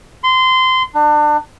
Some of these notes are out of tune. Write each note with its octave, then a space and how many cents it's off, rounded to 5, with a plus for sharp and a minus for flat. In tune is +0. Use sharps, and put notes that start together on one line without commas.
C6 -20
D4 +30